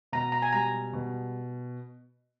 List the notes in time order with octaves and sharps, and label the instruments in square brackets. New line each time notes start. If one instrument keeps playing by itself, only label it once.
[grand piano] B2 [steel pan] A#5
[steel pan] A#5
G#5
[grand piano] G3 [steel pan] A#5
[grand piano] B2